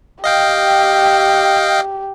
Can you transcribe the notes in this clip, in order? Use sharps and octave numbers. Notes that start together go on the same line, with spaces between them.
G4 D#5 F5 G5